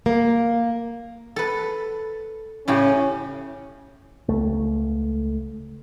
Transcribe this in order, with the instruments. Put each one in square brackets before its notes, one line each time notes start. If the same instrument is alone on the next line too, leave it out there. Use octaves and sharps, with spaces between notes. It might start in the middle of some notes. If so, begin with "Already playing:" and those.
[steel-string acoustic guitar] A#3
[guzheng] A4 B4
[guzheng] A2 C#3 G4 [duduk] C#4
[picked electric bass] C#2 A3